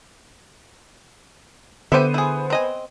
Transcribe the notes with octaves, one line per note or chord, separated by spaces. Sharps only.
D3 B3 G4 C5 E5 D#7
E4 G#4
C4 D#5 G#5